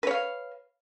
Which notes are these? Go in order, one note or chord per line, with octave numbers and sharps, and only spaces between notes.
B4 C#5 F5